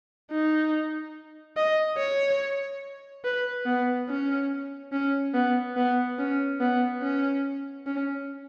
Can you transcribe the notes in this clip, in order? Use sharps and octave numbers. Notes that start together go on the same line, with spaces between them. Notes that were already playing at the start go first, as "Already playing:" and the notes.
D#4
D#5
C#5
B4
B3
C#4
C#4
B3
B3
C#4
B3
C#4
C#4